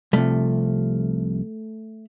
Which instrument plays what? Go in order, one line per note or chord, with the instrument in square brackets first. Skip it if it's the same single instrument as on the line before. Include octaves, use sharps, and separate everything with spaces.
[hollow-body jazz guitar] C2 C3 F3 G3 A3